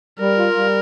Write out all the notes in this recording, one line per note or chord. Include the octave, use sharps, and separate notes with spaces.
G3 A#4
F4
G3